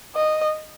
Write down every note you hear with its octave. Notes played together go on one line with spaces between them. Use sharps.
D#5